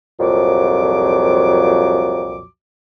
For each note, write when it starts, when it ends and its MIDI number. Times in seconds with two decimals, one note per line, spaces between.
0.20 2.45 36
0.20 2.45 41
0.20 2.45 46
0.20 2.45 53
0.20 2.45 54
0.20 2.45 86